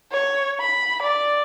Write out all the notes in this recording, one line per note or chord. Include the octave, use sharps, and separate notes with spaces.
C#5
B5
D5